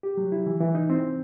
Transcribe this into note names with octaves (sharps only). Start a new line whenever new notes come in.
G4
F#3
E4
E3
E3
D#4
C4